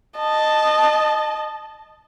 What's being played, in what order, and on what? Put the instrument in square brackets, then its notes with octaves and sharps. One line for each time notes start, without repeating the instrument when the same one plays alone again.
[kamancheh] D#5 A5